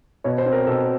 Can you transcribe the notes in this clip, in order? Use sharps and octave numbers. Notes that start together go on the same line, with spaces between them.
B2 C#5
C5
C4
A#4
B2 A4